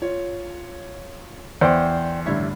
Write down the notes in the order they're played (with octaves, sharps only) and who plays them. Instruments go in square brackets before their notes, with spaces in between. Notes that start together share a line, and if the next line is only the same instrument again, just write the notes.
[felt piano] F4 C#5
[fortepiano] E2 C5 [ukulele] D5 G5
[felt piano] A1 G2 D3 [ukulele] E4 C#5 E5